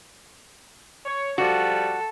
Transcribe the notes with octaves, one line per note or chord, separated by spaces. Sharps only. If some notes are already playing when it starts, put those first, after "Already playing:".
C#5
F3 G3 F#4 A4